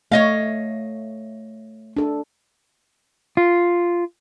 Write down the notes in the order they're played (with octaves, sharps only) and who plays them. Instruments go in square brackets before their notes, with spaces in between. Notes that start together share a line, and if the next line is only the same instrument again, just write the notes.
[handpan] A3 [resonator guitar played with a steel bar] C#5 D#5 F5
[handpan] D4 A4
[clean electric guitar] F4